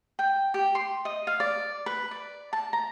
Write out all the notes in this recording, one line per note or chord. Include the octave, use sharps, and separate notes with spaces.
G5
G4
C6
D#5
F5
D5
B4
D5
A5
A#5